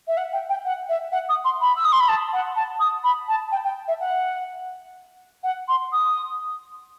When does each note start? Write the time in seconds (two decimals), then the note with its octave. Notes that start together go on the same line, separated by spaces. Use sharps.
0.07 E5
0.17 F#5
0.33 G5
0.49 G5
0.65 F#5
0.89 E5
1.12 F#5
1.29 D#6
1.45 C6
1.61 B5
1.76 E6
1.84 D#6
1.92 C6
2.00 B5
2.08 A5
2.33 F#5
2.56 A5
2.80 D#6
3.04 B5
3.28 A5
3.52 G5
3.64 G5
3.88 E5
4.00 F#5
5.43 F#5
5.68 C6
5.92 D#6